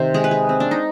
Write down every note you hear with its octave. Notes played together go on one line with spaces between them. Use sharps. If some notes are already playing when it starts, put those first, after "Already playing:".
Already playing: C3 D#3 C5
G#3 G#4
B4
G#4
C4
D4
D#4